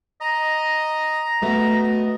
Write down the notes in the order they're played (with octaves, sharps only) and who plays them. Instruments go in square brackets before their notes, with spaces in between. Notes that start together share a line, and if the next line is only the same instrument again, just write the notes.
[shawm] D#5 [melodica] A#5
[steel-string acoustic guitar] A3 B3 F#4 [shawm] D#5